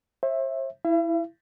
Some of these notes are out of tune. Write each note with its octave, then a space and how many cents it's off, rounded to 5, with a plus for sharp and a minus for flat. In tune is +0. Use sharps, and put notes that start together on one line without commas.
C5 +45 E5 +0
E4 +0 E5 +45